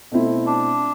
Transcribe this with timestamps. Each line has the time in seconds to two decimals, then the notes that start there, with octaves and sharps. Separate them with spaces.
0.11 B2 A3 C4 E4
0.46 D4